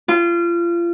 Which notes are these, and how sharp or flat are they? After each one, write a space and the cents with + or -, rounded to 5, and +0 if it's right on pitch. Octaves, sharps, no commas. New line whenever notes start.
F4 -30